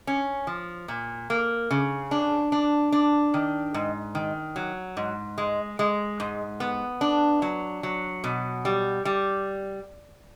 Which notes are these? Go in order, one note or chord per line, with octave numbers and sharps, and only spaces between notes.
C#4
F3
A#2
A#3
C#3
D4
D4
D4
D#3
G#2
D#3
F#3
G#2
G#3
G#3
G#2
B3
D4
F#3
F#3
B2
G3
G3